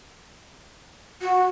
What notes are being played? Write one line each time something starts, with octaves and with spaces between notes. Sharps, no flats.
F#4